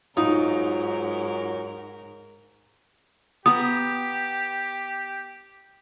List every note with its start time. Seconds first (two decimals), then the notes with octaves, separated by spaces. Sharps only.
0.17 G#2 F#3 D#4 F4 A#4
3.46 B3 G4 A#5 D#6